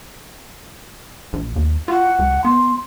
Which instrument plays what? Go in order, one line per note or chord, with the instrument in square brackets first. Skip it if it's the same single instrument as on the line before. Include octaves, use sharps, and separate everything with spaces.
[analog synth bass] A#1
D#2
[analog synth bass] F4 [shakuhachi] F#5
[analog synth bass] C#2
[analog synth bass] B3 [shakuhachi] C6